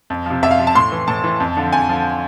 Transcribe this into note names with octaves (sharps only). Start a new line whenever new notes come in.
F2
C3 F3
F2 E5
F5
C3 F3
A5
A2 C6
E3
A2 A5
E3
F2
D3 F3
F2 G#5
D3 F3